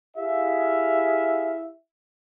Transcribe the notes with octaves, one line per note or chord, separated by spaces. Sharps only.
E4 G4 G#4 E5 F5